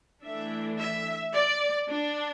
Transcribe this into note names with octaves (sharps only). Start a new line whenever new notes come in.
E3 A3 D4 E5
E5
D5
D4